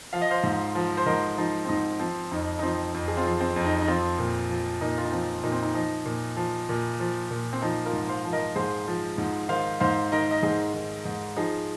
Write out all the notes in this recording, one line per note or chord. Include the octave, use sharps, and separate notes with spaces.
F3 F5
D#5
C5 F5
G#2
F3
C5
G#2 A#4 D#5
F3 D#4
C4
G#2 D#4
F3 C4
F2 D#4
D#4
F3 C4
F2
G#4
C4 F4
F3
C4
F2
D#4
D#4
F3 C4 F4
A#2
F3
A#2 D#4
F4
D#4
F3 C4
A#2 D#4
C4
D#4
F3 D#4
A#2
F3
A#2
F3
A#2
C4
F3 D#4
F4 A#4
G#2
C5 F5
F3
A#4 D#5
G#2 G#4 C5
F3
G#2
D#3 C5 F5
G#2 C5 F5
D#3 A#4 D#5
D#5
G#2 G#4 C5
D#3
G#2
F3 D#4 G#4